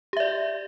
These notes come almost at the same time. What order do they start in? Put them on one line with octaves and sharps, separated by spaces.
G4 E5 D5